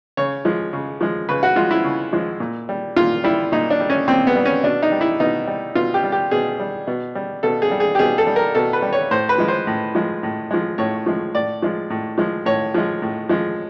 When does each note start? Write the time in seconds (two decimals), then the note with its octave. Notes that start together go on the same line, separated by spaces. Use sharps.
0.17 C#3 C#5
0.45 F3 G#3
0.73 C#3
1.01 F3 G#3
1.29 C#3 B4
1.43 F#4
1.56 F3 G#3 F4
1.71 E4
1.84 C#3
2.13 F3 G#3
2.40 A#2
2.69 G3
2.96 A#2 F4
3.24 G3 E4
3.52 A#2 D#4
3.70 D4
3.80 G3
3.90 C#4
4.08 A#2 C4
4.27 B3
4.36 G3
4.45 C#4
4.63 B2 D4
4.82 D#4
4.92 G3
5.01 E4
5.20 B2 D#4
5.47 G3
5.75 B2 F4
5.94 G4
6.03 G3
6.12 G4
6.31 B2 G#4
6.60 G3
6.87 B2
7.15 G3
7.43 B2 A4
7.62 G#4
7.71 G3
7.80 G#4
7.95 G4
7.99 B2 G#4
8.18 A4
8.27 G3
8.36 A#4
8.55 B2 A4
8.73 B4
8.82 G3
8.93 C#5
9.11 A2 C5
9.29 B4
9.38 F3 G#3
9.48 C5
9.67 A2
9.95 F3 G#3
10.23 A2
10.51 F3 G#3
10.78 A2 C#5
11.06 F3 G#3
11.35 A2 D5
11.62 F3 G#3
11.90 A2
12.18 F3 G#3
12.46 A2 C#5
12.74 F3 G#3
13.02 A2
13.29 F3 G#3